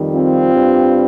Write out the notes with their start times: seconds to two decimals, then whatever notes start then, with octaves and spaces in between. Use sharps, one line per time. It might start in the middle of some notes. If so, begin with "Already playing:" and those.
Already playing: F2 D#3 G3
0.15 C4 F4
0.53 G2 G3